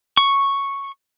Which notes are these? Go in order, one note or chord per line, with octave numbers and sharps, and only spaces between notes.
C#6